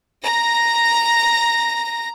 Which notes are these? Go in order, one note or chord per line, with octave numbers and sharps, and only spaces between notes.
A#5 A#6